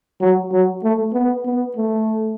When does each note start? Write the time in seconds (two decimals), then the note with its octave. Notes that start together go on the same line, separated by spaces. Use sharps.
0.21 F#3
0.52 F#3
0.84 A3
1.14 B3
1.46 B3
1.77 A3